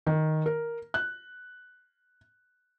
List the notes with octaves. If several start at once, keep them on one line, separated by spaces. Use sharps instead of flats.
D#3
A#4
F#6